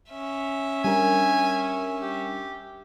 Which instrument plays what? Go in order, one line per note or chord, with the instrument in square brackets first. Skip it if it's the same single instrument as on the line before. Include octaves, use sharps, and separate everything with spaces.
[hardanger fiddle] C#4 E5
[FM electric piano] G3 D4 A#4 [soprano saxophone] G#5
[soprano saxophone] G4